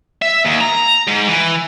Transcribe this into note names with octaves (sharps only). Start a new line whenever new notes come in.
E5
D#2
A#5
G#2
E3